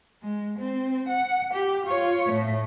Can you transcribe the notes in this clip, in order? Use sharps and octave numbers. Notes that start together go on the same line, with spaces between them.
G#3
C4
F#5
G4
F4 C#5
A2 A3